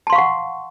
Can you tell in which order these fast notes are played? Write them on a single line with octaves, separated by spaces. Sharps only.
A5 C6 F5 C#6 F#5